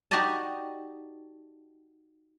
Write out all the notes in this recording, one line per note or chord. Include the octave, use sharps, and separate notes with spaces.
D#4 F#4 G4 D5 D#5 A5